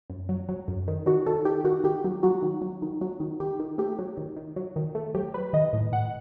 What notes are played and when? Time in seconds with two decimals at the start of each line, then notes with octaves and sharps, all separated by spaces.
0.10 F#2
0.29 F#3
0.49 F#3
0.68 F#2
0.88 D#3
1.06 D#3 F#4
1.26 D#3 A4
1.45 D#3 G4
1.64 D#3 F#4
1.84 D#3 G4
2.04 F#3
2.23 F#3 F#4
2.43 D#3
2.62 F#3
2.82 D#3
3.01 F#3
3.20 D#3
3.40 D#3 G4
3.59 D#3
3.78 A3 G4
3.99 F#3
4.17 D#3
4.37 D#3
4.56 F#3
4.76 D#3
4.95 A3
5.15 F#3 G4
5.34 F#3 B4
5.53 D#3 D#5
5.73 A2
5.92 A2 F#5